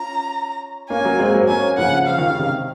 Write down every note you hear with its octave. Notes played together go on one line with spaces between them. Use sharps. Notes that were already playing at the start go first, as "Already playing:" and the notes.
Already playing: C#4 F4 A#5
A#3 C#4 G#5
F#3 A#3
G#3 C4
F#3 A#3
C4
A#3 C#4 G#5
C#3 F3 F#5
F3 F5
D#3
C#3
C3 D#3